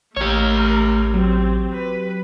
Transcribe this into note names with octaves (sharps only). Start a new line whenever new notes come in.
A1 A3 G4 A#4 C#5
F#3 C4
B4